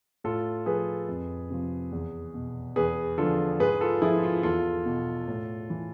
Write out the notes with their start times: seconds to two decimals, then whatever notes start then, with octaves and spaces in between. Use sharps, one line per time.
0.24 A2 F4 A4
0.66 F3 G#4 B4
1.08 F2
1.50 C3 F3
1.92 E2
2.34 B2
2.76 E2 G#4 B4
3.18 D3 F3 F4 A4
3.60 G#2 G#4 B4
3.81 F4 A4
4.02 F3 E4 G#4
4.23 F4
4.43 E2 F4 A4
4.85 B2
5.28 A2
5.70 E3